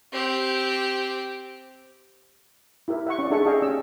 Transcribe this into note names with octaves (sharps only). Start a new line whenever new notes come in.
C4 G4
E4 G4 A#4 E5
E5 F#5 C#6
C#4 D5
D4 D#4 G#4 A4 E5 C#6
G4 G#4 D#5 F5 G5
C#4 E6